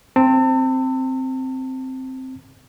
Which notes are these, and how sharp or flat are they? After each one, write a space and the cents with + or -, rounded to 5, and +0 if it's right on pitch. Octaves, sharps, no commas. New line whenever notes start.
C4 +0 A5 +40